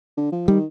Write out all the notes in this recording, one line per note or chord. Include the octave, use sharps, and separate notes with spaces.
D3
F3
D#3 G3